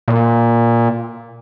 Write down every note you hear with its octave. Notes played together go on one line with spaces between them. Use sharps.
A#2